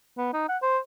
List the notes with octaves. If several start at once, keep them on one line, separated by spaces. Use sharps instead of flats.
B3
D#4
F#5
C5